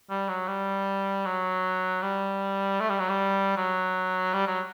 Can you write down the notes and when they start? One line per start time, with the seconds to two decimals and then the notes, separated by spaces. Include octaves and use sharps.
0.10 G3
0.29 F#3
0.48 G3
1.26 F#3
2.02 G3
2.80 A3
2.90 G3
2.99 F#3
3.09 G3
3.57 F#3
4.33 G3
4.47 F#3